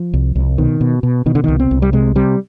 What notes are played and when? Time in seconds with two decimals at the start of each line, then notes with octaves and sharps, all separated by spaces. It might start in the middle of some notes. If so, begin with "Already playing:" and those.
Already playing: F3
0.14 C2
0.36 C2
0.58 B2 D#3
0.81 B2
1.03 B2
1.26 B2 D#3
1.35 D3
1.44 C2 D#3
1.60 C4
1.71 C2
1.82 G3
1.93 C3 G#3
2.16 C3 G3